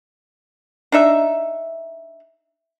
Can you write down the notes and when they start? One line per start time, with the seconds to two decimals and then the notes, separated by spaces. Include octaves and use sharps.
0.92 D4 D#4 E5